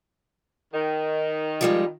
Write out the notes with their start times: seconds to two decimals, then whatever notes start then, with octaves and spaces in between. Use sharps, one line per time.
0.74 D#3
1.61 F3 G3 G#3